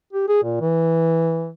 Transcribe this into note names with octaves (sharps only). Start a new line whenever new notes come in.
G4
G#4
A#2
E3